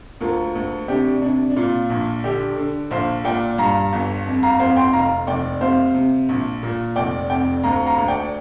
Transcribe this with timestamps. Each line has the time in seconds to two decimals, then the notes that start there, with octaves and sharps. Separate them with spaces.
0.21 D2 F4 A#4
0.55 D2
0.88 C3 D4 G4
1.22 C3 D4
1.50 D4
1.56 A#2 F4
1.90 A#1
2.24 D3 D4 G4
2.57 D3
2.91 A#1 C5 F5
3.24 A#2 D5 G5
3.58 G2 F5 A#5
3.93 G1
4.26 F2
4.43 F5 A#5
4.60 F2 C5 F5
4.76 G5 C6
4.93 F1 F5 A#5
5.27 F1 D5 G5
5.61 C3 C5 F5
5.94 C3
6.29 A#1
6.63 A#2
6.96 F1 D5 G5
7.30 F2 D5 G5
7.63 D2 F5 A#5
7.86 F5 A#5
7.98 D2
8.08 D5 G5